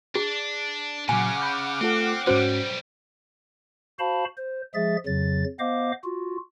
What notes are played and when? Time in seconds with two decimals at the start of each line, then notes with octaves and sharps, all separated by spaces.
0.15 D4 G#4
1.09 A#2 C#3 F#3 F#5 G#5 D6 F6
1.42 B5 G6
1.81 A3 C4 F4 A4
2.27 B1 G#2 G3 C#4 F#4 C5
3.99 F#4 C5 F5 A5 B5
4.37 C5
4.74 F3 G#3 G#4 E5 A6
5.06 F2 C#3 F#3 A6
5.59 B3 C5 D#5 F5 D6
6.04 F4 F#4